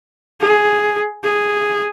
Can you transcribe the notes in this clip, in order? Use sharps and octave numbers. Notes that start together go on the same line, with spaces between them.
G#4
G#4